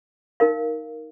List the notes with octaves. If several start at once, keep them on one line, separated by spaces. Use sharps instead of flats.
D#4 A#4 F5